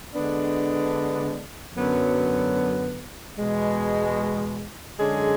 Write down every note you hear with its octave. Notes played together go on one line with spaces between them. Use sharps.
D3 G#3 B3 D4
F#2 D3 F#3 B3
E2 B2 G#3
F#2 D3 G#3 C#4 G#4